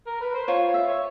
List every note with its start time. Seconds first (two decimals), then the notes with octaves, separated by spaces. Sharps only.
0.07 A#4
0.20 B4
0.34 C5
0.47 F4 C#5
0.74 E5
0.87 C#5